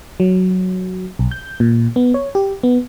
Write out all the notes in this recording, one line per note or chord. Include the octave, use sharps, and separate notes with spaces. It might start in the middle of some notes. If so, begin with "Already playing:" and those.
F#3
B1
G6
A#2
B3
C#5
G4
B3